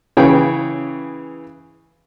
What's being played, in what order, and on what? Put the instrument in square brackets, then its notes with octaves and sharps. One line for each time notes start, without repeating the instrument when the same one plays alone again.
[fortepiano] C#3 E3 G#4 B4 C#5 G5